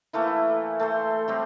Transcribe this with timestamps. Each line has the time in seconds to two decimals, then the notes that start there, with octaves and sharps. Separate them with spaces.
0.13 E3 A3 A#3 E4
0.80 A3 A4 C5
1.28 F#3 G3 C4